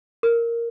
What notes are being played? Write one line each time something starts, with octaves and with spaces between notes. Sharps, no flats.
A#4